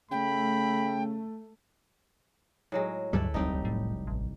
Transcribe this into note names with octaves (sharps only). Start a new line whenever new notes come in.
C#3 A3 G5 B5
A2 F#3 G#3
D2 G2 F#3 G3 E4 A4 B4
F1 C2 F#3 D#4 G4
A2
A1